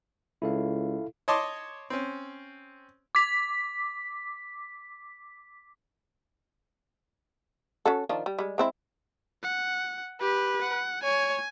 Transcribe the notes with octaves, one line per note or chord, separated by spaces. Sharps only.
C#2 E4 A4 F5
C#5 D#5 A5 C6 D6
C4 C#4
D6 B6
C#4 F#4 A4
D#3 F3 D4
G3
G3 G#3
G#3 C4 E4
F#5
G4 B4
F#5
C#5 G#5